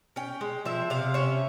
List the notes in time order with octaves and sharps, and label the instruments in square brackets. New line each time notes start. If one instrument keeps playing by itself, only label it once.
[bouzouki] C#4 G5
G#3
F3 E5
C3 F5
C#4 E5